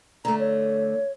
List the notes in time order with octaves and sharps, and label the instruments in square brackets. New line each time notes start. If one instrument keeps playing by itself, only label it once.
[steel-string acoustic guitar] D3 A3 [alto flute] A#5
[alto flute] C#5